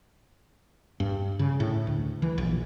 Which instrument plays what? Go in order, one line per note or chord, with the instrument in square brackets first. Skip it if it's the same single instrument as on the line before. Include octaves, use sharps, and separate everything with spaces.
[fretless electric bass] G2
C#3
A2
D2
E3
A#1